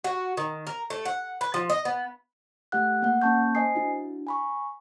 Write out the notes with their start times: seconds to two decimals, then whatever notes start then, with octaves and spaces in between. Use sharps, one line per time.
0.04 F#4
0.37 D#3
0.67 A#4
0.90 A3
1.05 F#5
1.41 B4
1.54 F3
1.70 D#5
1.85 B3
2.72 A3 G4 F#5 F#6
3.02 A#3 F#5
3.21 A#3 C#4 A5 C#6 G6
3.55 C5 D#5 G#5 D#6 C7
3.75 D4 E4 F#4
4.27 G#5 B5 C#6